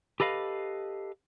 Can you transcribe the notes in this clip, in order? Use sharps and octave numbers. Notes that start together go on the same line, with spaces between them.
G4 A4 B4 D#5 F5